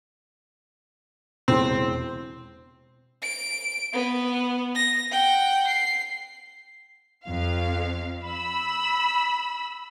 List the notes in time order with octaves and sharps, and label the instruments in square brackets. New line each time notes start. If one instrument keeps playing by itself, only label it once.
[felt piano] E1 E4 C6 [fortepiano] C4
[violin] D7
B3
A#6
F#5 G5
C7
[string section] F2 F5
B5 E6